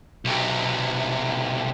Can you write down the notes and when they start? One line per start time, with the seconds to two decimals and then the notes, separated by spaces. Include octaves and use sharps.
0.25 B1 C3